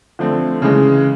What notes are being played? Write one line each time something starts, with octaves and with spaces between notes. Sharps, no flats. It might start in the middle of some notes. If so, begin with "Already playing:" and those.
D3 F3 A3 C4
C#3 E3 G#3